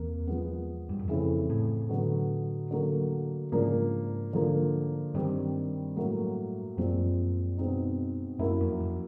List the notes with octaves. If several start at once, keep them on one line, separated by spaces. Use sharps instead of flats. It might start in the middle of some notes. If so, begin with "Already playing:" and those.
Already playing: E2 C3 A#3
F3 G#3 B3
G2
F#2
F2 C#3 E3 A3 C4 E4
A2
D3 F#3 B3
D3 F#3 A#3
G#2 C#3 F3 A#3 D4
D3 F3 A#3 D4
G2 D#3 G3 C4
A2 F#3 A#3
F#2 A#2 F3 G#3 C4
B2 G#3 C4 D#4
F#2 F#3 A#3 C#4 E4
F2
F2